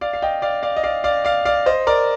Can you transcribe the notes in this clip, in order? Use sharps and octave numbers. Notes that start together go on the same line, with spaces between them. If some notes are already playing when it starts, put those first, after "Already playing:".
D5 F5
F5
D#5 G5
D5 F5
D5 F5
D#5
D5 F5
D5 F5
D5 F5
D5 F5
C5 D#5
A#4 D5